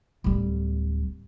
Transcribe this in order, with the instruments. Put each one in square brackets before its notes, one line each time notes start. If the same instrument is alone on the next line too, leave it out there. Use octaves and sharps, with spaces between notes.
[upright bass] D1 G3